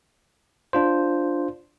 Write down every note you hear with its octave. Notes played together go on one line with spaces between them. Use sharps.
D4 F4 C5